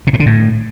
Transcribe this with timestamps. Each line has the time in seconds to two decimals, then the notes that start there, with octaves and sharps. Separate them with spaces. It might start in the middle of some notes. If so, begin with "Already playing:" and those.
0.07 C3
0.13 A2
0.20 D3
0.26 A2